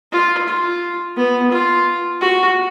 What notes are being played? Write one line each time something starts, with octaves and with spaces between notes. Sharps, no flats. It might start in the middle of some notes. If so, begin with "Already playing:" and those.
F4
F4
B3
F4
F#4